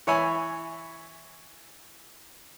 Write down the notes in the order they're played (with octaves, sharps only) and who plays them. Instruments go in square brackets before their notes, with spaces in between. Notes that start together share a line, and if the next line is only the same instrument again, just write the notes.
[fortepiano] E3 C#5 E5 G#5 B5